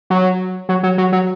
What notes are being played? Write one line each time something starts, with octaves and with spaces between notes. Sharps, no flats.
F#3
F#3
F#3
F#3
F#3